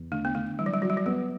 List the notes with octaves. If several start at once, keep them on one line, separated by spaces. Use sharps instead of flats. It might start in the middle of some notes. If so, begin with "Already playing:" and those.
Already playing: E2
D3 A3
B3
D3 A3
E3 G3
F#3
G3
F#3 F#4
G3
F#3
G3 B3